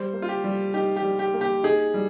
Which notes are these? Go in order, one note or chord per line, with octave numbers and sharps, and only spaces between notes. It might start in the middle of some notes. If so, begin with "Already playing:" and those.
Already playing: G3 C5
A#3
F4
G4
G3
D#4 G4
G4
G3
G4
A#3
G4
D#4 G#4
G3